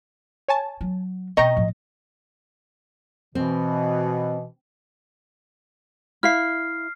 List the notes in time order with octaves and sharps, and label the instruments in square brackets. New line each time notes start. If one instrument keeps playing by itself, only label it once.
[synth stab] C#5 G#5 A5
[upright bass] F#3
[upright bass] B2 C4 [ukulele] D#5 [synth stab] G5 A#5 C#6
[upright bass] A2 F3
[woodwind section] B2 E3 [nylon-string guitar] C4
[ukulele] E4 E5 F5 [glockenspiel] F6 C7